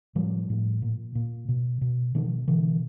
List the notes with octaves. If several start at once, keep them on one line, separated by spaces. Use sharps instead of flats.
A2 F3 G3
A2
A#2
A#2
B2
B2
B2 D#3 F3
B2 D3 E3